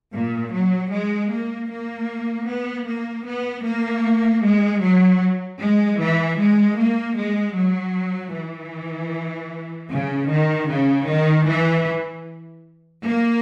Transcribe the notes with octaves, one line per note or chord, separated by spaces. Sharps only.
A#2
F#3
G#3
A#3
A#3
B3
A#3
B3
A#3
G#3
F#3
G#3
E3
G#3
A#3
G#3
F#3
E3
C#3
D#3
C#3
D#3
E3
A#3